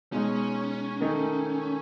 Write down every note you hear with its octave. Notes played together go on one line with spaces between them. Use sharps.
B2 G#3 C#4 D#4
D#3 A3 D#4